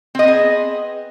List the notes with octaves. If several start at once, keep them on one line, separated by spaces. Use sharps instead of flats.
B3 C4 G#4 D#5